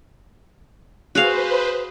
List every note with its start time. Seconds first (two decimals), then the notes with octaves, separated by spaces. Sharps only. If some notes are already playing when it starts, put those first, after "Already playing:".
1.15 F#4 G#4 B4 C5 F5